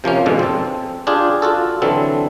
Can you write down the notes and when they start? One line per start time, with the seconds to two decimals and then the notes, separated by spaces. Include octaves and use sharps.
0.04 C3 F3 A#3 C#4
0.26 F2 G#2 B2 D3 F3
0.39 C4 A4
1.07 D4 F4 G4 G#4
1.42 F4 F#4 A4
1.82 D3 E3 F#3 C4 A4